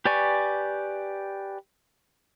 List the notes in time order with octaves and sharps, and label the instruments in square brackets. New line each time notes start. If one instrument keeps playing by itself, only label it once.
[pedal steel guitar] G4 B4 D5 G#5 C#6